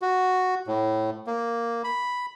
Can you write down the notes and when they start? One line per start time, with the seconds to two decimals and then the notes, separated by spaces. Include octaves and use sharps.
0.02 F#4
0.67 A2
1.27 A#3
1.84 B5